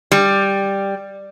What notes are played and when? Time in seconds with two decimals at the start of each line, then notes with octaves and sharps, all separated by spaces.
0.12 G3